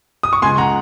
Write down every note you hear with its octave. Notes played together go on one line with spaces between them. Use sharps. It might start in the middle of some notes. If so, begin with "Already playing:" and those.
D#6
C#6
C#2 G#5 C6
F#5 A#5